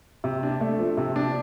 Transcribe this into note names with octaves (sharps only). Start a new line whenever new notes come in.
C3
D4
A3
F3
C3
D4